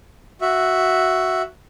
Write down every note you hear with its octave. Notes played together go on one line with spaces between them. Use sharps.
F#4 E5